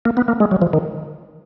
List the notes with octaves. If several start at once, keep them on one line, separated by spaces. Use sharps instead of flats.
A#3
B3
A#3
G#3
F#3
F3
D#3